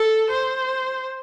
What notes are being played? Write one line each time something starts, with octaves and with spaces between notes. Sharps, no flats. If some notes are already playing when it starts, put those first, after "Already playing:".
Already playing: A4
C5